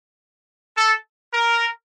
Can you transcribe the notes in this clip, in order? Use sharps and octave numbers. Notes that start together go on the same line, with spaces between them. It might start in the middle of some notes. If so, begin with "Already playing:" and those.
A4
A#4